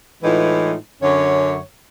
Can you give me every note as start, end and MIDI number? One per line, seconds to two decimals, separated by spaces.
0.23 0.75 45
0.23 0.75 52
0.23 0.75 56
0.23 0.75 63
0.23 0.75 65
0.23 0.75 71
1.03 1.58 42
1.03 1.58 50
1.03 1.58 61
1.03 1.58 73